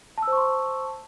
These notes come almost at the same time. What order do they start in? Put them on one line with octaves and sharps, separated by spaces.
A5 E6 C5 C#6 C6